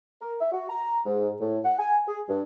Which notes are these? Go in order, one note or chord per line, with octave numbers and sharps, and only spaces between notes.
A#4
E5
F#4
A#5
G#2
A2
F#5
G#5
G#4
G2